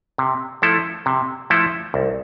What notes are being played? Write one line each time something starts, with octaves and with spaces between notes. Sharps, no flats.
C3
F3 A3 E4 A4
C3
F3 A3 E4 A4
C2